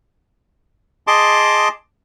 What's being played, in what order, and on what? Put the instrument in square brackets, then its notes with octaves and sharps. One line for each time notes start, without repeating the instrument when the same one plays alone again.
[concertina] G#4 D#5 A5 C6 D6